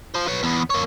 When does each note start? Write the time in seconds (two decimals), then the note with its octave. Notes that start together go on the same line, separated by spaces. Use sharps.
0.15 F4 C5
0.27 B4 C#5
0.43 E2 B3
0.70 A#3 C#5